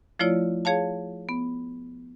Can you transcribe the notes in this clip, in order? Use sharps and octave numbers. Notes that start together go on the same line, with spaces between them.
F3 A3 E4 F4 C#5 D5
G#4 C#5 F5 A5
B3